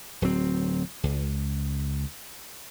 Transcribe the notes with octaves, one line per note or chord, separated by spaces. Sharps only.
D1 F#3 C4
C#2